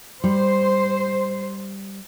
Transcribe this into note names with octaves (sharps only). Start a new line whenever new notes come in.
G3 C5